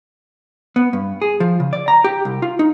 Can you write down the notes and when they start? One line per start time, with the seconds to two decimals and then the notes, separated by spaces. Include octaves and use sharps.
0.76 B3
0.93 G2
1.22 G#4
1.40 F3
1.60 C#3
1.73 D5
1.88 A#5
2.04 G4
2.25 C2
2.42 F4
2.59 D#4